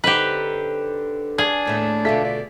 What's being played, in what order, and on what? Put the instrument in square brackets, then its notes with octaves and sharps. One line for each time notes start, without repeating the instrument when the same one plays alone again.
[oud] D3 C4 D#4 [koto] G4 B4
[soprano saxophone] D4 [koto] G#4 [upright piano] G#6
[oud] D#2 A2 A3
[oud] B2 D3 F4 [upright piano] A3 B6
[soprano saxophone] D5